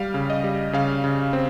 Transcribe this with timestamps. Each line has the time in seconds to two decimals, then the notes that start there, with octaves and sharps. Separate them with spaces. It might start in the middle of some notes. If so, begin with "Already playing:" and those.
Already playing: G3 F5
0.14 C#3
0.30 D#5
0.44 G3
0.73 C#3 F5
1.04 C#3
1.33 C4